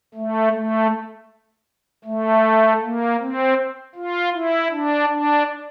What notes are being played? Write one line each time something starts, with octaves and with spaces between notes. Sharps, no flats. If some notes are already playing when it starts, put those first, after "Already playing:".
A3
A3
A3
A#3
C4
F4
E4
D4
D4